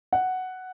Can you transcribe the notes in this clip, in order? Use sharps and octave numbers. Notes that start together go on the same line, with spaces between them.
F#5